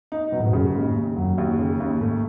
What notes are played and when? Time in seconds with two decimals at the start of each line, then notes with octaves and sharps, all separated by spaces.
0.12 D#4
0.32 B2 F#3
0.40 A2
0.46 G#2
0.53 F#2 A2 C#3
0.74 D#2 G#2
0.96 D#2
1.16 F#2 F#3
1.38 D#2
1.59 F#2 C#3
1.80 D#2
2.01 G#2 A3